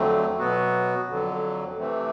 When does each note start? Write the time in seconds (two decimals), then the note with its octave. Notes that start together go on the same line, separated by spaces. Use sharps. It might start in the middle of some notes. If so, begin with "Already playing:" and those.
Already playing: F2 D3 F#3 A3 C4
0.39 B2 F#3 B3 F#4
1.09 F2 D3 F#3
1.78 C3 E3 A3 C4